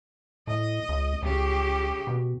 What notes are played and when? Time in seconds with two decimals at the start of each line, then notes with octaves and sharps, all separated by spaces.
0.47 A2 D#5
0.89 C#2
1.23 C#2 C#3 G4
2.07 B2